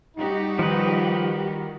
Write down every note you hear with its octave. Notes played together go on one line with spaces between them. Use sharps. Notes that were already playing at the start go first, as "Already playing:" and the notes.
G3 D#4 F#4 G4
D#3 F3 B4